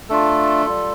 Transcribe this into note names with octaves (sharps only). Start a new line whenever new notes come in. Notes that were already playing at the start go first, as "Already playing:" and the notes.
A3 D4 F4 A4
G3 F4